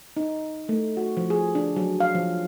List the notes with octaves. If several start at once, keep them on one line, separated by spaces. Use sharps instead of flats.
D#4
A3
F#4
F3
G#4
D4
F#3
F5
F3